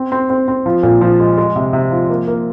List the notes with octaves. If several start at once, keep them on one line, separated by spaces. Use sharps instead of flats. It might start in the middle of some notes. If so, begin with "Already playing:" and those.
Already playing: C4
C4
C4
C4
F3
A#2
F3
G#3
G#3
C3
C3
F3
A#3
A#3